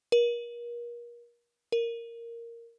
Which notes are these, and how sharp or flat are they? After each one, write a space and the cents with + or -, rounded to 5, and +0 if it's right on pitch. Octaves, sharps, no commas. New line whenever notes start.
A#4 +35
A#4 -5